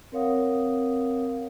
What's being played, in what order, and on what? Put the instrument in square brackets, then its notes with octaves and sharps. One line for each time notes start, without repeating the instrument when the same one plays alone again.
[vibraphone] C4 A#4 C#5 F5 F#5 D#6